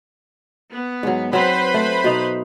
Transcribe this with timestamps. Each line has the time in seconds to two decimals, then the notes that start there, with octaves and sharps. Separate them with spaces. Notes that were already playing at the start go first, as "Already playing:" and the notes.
0.74 B3
1.03 G#2 F#3
1.33 F#3 C4 B4 C5 B5
1.74 A3
2.04 B2 D#4